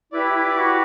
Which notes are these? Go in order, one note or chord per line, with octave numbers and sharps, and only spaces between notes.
E4 G4 B4 D5
E4
F#4